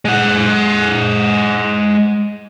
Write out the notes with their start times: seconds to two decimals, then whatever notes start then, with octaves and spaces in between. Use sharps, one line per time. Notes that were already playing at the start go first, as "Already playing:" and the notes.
0.05 G#3 F#5